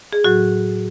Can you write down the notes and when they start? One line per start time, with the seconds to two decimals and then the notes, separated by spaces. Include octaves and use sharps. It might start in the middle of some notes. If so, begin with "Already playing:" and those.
0.13 G#4
0.24 A2 F#3 F#4